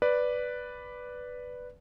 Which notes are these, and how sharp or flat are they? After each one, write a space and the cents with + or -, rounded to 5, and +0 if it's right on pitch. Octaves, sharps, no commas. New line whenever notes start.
B4 +0 D5 +0